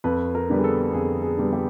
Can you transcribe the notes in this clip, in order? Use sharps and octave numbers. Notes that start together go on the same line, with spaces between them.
F2 B4
A#4
D3 G3 B3
G#4
A4
F2 G#4
G#4
D3 G3 B3
G4